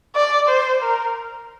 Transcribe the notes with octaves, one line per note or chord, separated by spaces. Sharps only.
D5
C5
A#4